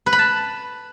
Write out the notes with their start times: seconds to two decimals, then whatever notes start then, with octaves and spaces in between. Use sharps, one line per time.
0.06 B4
0.13 B5
0.19 A5